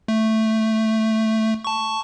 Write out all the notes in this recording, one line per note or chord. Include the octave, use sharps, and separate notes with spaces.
A3
A5 C#6